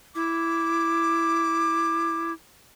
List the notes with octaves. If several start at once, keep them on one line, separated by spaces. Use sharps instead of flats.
E4 D6